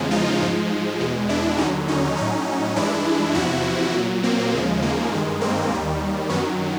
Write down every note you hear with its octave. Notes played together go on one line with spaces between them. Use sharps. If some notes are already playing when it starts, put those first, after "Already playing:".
Already playing: E2 C#3 F3 G#3
D#4 F4
G#2 F3 G#3
E2 B2 G#3
D4 E4
D#2 D3 F#3 C#4 D#4
C#4 D#4
A2 F#3 C#4 D#4
G2 E3 G#3 D4 E4
E2 C3 F3 E4 F#4
A#2 F#3
A#3 C4
D#2 C#3 F3 G#3
G#3 A#3
G2 D#3 G#3
A#3 C4
D#2 D#3 G3
F#2 D#3 F#3 B3 C#4